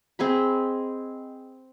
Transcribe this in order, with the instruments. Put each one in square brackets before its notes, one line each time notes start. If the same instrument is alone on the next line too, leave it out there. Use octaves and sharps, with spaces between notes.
[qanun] C4 G#4 D#5 B5